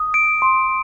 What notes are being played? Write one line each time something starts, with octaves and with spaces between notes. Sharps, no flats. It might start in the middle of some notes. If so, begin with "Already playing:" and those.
Already playing: D#6
D7
C6